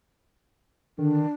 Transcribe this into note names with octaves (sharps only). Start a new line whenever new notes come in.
D3 D#3 D4